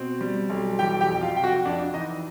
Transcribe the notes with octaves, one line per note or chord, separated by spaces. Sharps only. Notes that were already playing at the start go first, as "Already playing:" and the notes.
Already playing: B2 C4
G3
B1
E3 G4 G5
G4 G5
F2
F4 F5
C3 G5
F#4 F#5
F2 D4 D5
E3 D#4 D#5